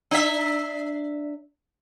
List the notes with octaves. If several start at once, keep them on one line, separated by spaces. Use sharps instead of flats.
D4 E5